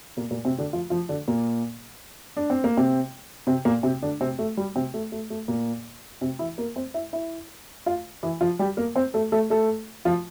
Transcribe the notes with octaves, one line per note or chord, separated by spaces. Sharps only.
A#2 A#3
A#2 A#3
C3 C4
D3 D4
F3 F4
F3 F4
D3 D4
A#2 A#3
D4
C4
A#3
C3 C4
C3 C4
A#2 A#3
C3 C4
D3 D4
C3 C4
A3
G3
C3 C4
A3
A3
A3
A#2 A#3
C3 C4
E3 E4
A#3 A#4
C4 C5
E4 E5
E4 E5
F4 F5
E3 E4
F3 F4
G3 G4
A#3 A#4
C4 C5
A3 A4
A3 A4
A3 A4
F3 F4